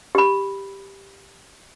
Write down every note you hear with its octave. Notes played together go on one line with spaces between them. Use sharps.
G4 B5